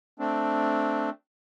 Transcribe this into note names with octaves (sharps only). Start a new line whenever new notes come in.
A3 C4 D4